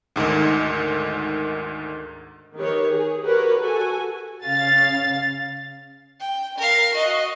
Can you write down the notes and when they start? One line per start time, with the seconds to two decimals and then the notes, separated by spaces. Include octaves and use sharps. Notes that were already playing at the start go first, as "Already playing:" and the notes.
0.16 D2 G#2 D3 D#3
2.56 D#3 G4 B4 C#5
2.89 G#4
3.22 F#4 G4 A#4 B4 C#5
3.60 F#4 A4 G#5
4.47 C#3 F5 A6
6.21 G5
6.58 A#4 F5
6.94 F#4 D#5